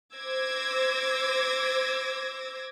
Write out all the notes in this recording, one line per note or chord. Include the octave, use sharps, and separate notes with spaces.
C5 D6 E6 G#6 A#6